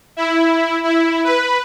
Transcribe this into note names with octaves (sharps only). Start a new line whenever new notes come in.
E4
E4
B4